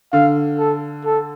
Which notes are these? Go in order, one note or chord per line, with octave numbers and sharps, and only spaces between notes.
D3 F5
A4
A4